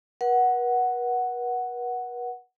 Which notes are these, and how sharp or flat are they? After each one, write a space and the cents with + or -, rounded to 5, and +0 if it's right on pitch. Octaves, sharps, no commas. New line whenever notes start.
B4 -45 F#5 +0